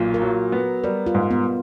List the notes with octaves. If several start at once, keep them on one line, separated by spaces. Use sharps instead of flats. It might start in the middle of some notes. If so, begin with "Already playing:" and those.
Already playing: B1 A#2
A#4
F#3
B3
G3 A#4
F4
G#2
B3